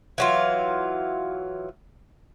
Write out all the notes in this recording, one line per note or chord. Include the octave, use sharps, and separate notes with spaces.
E3 F#3 F4